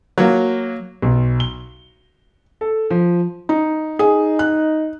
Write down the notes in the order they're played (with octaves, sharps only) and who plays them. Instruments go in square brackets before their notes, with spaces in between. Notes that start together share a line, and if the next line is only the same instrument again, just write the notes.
[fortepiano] F#3 A#3
[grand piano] B1
G7
A4
F3
[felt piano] D#4
[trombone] D#4 [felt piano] G#4
[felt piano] F#6